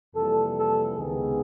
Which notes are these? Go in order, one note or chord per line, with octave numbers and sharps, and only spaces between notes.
F2 C3 E3 G3 A#3 A4
A4
C#2 C3 D#3 G#3 B3 G#4